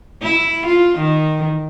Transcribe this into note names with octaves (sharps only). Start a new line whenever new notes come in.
E4
F4
D#3